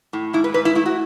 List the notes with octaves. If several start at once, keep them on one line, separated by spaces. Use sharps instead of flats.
A2
G#2 E4
B4
G#2 B4
E4
A3 E4
F#4